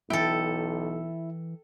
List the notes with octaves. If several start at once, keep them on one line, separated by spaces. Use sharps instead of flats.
B1 E3 E4 A4 E5 G5